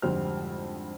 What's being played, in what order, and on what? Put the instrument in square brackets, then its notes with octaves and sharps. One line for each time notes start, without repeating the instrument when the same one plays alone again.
[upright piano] G#1 F2 D3 G3 C5 F6